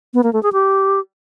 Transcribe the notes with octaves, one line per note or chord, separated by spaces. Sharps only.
B3
A#3
A3
G#4
G4